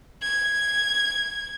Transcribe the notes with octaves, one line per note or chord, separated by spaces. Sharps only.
G#6